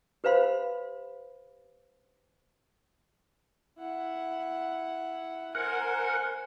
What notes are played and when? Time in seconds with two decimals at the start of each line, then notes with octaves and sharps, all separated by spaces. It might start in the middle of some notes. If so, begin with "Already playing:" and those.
0.24 G4 B4 C5 F5 B5 C6
3.78 E4 F#5
5.55 A#4 C5 F#5 G#5